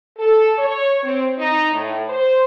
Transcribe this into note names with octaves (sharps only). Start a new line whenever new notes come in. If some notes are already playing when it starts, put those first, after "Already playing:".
A4
C#5
C4
D#4
A2
C5